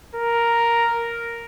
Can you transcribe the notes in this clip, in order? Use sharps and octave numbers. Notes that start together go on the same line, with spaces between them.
A#4